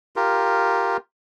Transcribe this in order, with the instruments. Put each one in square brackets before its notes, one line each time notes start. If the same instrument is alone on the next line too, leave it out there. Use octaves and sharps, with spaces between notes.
[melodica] F4 G4 A#4